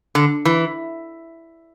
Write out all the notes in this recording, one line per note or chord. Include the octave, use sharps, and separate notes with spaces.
D3
E3